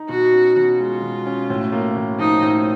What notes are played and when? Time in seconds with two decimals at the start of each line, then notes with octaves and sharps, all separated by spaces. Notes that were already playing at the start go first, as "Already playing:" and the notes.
Already playing: D#4
0.09 B2 F#4
0.33 C#4
0.57 B2
0.79 G#3 F4
1.02 B2
1.26 C#4
1.50 A2
1.72 A#3
1.96 A2
2.19 F3 D#4
2.42 A2